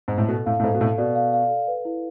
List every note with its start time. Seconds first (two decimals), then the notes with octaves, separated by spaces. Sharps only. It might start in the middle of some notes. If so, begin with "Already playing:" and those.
0.08 G#2
0.18 A2
0.28 B2 A4
0.46 A2 F5
0.60 A2
0.64 G#2 A4
0.75 B2
0.81 A2 A4
0.98 B2 D5
1.15 F5
1.33 F5
1.50 A4
1.67 B4
1.85 E4